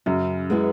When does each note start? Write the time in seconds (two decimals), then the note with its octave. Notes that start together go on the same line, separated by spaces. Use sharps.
0.06 F#2 C#3
0.50 G#3 B3 E4 G#4